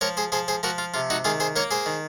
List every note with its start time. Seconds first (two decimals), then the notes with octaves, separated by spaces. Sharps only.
0.01 F3 A#4 C#5
0.17 G#4 C5
0.32 F3 G#4 C5
0.48 G#4 C5
0.63 F3 F#4 A#4
0.78 F4
0.94 C3 F4
1.10 D#4 F#4
1.24 D#3 F4 G#4
1.40 G#4 C5
1.56 A#3 A#4 C#5
1.71 G#4 C5
1.86 D#3